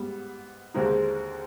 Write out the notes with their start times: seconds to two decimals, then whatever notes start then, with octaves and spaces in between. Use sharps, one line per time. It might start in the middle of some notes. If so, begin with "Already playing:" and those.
Already playing: G#2 G3 B3
0.74 D#2 D3 G#3 C4 D#4